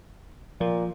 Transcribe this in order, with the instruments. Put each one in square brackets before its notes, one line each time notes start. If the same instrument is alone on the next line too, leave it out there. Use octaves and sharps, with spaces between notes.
[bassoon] A#2 [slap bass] F3